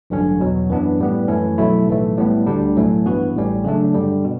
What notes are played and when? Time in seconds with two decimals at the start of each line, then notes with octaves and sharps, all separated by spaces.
0.10 A1 G2 D3 F#3 C#4
0.40 E2 B2 F#3
0.70 F#2 E3 B3 D4
0.99 A2 G3 B3
1.28 F#2 E3 A3 C#4
1.58 B1 B2 F#3 A3 E4
1.87 B1 A2 E3 A3
2.18 A2 G3 B3
2.47 D2 D3 G3 D4
2.76 B1 A2 F#3 A3 C#4
3.06 G2 E3 B3 F#4
3.36 A1 A2 G3 C#4
3.64 C#3 F#3 A3 D4
3.95 G2 D3 G3
4.24 B2